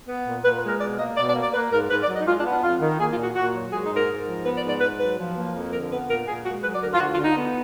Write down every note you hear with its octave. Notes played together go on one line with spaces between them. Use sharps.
B3
A#2
A#2 B4
B4
G#3
A#4
B2 D5
A#3 D#5
B2 D5
D5
A#3
D5
A#3 B4
G#2 A#4
G#2 B4
D5
F#3
D#5
D#4
G#3 F4
D4
B3
D4
F2 F4
D#3
A#3 G#4
F4
A#2
F#4
A#2 F#4
F#3
G#3 G#4
D#4
G#2
A#4
G#2
F3
B3 B4
D5
G#2
D5
G#2 B4
F#3 B4
F3
A#3
F2
D3 A#4
B3 B4
A#2 A#4
A#2 G#4
G#3 F#4
F#3 B4
D5
D2 A#4
F4
D2 F#4
F4
D3
D#4
B3